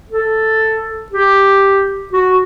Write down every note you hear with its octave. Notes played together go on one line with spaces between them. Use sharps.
A4
G4
F#4